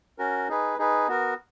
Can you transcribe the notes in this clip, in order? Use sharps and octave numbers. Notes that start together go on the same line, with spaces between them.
C#4 F#4 A#4
D#4 G#4 B4
D#4 G#4 B4
B3 F#4 A#4